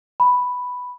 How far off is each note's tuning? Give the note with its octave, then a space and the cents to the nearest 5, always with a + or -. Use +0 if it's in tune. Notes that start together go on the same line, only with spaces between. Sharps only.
B5 +0